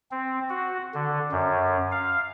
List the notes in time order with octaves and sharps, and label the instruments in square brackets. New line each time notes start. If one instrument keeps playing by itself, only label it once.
[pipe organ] C4
F#4
D3
F#2
F5